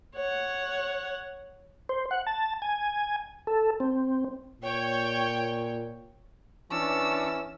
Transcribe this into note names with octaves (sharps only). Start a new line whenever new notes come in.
C#5 F#5
C5
F#5
A5
G#5
A4
C4
A#2 C#5 G5
E3 C#4 D4 C#5 A5 E6